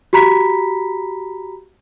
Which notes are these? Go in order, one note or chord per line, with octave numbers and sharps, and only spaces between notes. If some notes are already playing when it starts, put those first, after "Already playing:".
F#4 G4 A#5 B5 B6